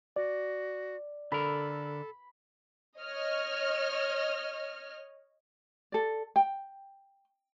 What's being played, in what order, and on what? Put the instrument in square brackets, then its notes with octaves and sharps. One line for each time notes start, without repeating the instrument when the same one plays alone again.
[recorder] F#4 [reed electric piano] D5
[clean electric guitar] D3 A#4 [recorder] A4 [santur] B5
[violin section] C#5 D#5 F6
[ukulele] A4 D5
G5